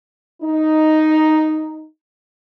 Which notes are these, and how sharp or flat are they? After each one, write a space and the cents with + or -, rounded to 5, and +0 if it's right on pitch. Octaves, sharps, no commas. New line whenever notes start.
D#4 +0